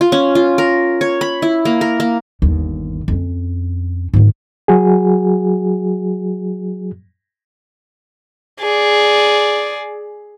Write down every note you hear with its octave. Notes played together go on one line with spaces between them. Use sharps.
F4
C#4
F4
A#4
C#5
B5
E4
A#3
A#4
A#3
G1 D#2
F2 C#4
G#2 D#3
F#3 F#4 G#4
G#4 D5